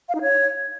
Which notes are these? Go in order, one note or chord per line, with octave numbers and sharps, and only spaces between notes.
F5
D#4
C#5